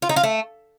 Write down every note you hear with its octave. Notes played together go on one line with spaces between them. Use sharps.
F4
D#4
F4
A3